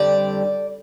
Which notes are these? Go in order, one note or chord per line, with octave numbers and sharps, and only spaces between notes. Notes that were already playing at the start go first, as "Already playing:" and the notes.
Already playing: F2 D3 G3 D5